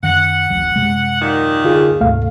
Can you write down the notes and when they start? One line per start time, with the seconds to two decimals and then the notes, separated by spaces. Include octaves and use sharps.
0.03 F#2 D#3 F#5
0.50 D1 A1 F#3
0.76 F#2 C3 G#3
1.20 D#2 A#2 D#3
1.65 D3 F4 G#4
2.01 D2 G#2 C3 A3 F5